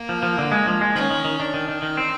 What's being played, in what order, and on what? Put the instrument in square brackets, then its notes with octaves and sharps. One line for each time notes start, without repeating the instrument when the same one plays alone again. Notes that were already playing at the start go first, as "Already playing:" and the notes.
Already playing: [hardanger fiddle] A#3
[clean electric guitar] F3
F3
D3
G#3
F3
G#3
[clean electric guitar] D#3 [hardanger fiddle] C#4
[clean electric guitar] D#3
D#3
[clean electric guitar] D#3 [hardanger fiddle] D4
[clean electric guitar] D#3
D#3
[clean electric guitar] D#3 [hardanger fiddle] D#4
[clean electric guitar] C4